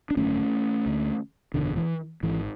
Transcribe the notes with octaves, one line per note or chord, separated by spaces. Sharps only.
D4
G#1 F#2 D3 A3 C#4
D2 D3
F#1 E2 B2 D3
E3
G#1 G#2 E3